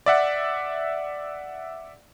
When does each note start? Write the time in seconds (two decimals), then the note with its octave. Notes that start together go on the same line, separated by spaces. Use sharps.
0.06 D5 E5 F#5